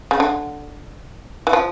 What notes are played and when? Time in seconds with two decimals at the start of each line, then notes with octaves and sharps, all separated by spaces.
0.11 C#3
0.20 D3
1.47 E3
1.53 F3